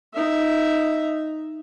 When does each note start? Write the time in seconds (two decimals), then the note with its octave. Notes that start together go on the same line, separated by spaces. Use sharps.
0.14 D#4 E5